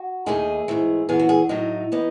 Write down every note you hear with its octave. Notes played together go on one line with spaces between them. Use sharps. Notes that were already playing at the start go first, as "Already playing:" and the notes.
Already playing: F#4
D#2 D#3 A3 D#4 G#4
G#2 E3 A3
F#2 E3 B3 G#4
F#4
G#4
A2 F#3 A3 D#4
E3 B3 D#4